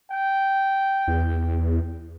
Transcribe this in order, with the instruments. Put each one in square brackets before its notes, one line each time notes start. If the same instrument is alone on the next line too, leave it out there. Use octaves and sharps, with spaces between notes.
[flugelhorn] G5
[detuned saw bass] E2